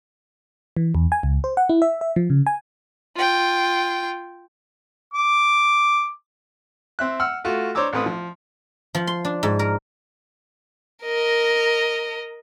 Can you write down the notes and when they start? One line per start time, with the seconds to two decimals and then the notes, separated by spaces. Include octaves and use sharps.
0.77 E3
0.95 E2
1.12 G#5
1.23 C#2
1.44 C5
1.57 F#5
1.69 E4
1.82 E5
2.01 E5
2.16 F3
2.30 C#3
2.47 G#5
3.16 F4 G5
5.14 D6
6.99 C4 E5 F#6
7.20 F#5 E6 F6
7.45 A3 F4 F#4
7.75 D4 C5 C#5 A#5 D6 E6
7.93 A1 A3 C4 B4 D#6
8.06 F3
8.95 F3
9.07 C6
9.25 D4
9.43 G#2
9.59 A#4
11.04 A#4 D#5